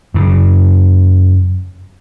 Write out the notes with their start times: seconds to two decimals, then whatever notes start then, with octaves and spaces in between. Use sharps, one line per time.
0.14 F#2 C#3